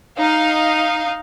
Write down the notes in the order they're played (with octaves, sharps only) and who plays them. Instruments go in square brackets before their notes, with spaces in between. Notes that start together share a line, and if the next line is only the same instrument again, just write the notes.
[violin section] D#4 F5